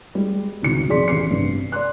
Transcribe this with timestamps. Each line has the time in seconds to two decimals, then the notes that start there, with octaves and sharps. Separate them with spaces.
0.15 G3 G#3
0.62 G#1 C#2 B2 D#4 F#4 C#7
0.89 F2 C3 G#4 D5 C6 B6
1.08 A1 C7 C#7
1.31 G2 C3 G3
1.72 D5 C6 F#6